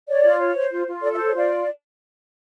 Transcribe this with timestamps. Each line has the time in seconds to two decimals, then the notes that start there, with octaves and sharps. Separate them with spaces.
0.08 C#5 D5
0.24 F4
0.39 C#5
0.55 C5
0.71 F4
0.87 F4
1.02 A4 D5
1.14 E5
1.18 C5
1.26 C#5
1.34 F4 D5